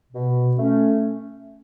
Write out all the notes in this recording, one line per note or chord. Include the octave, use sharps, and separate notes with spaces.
B2
A3 C#4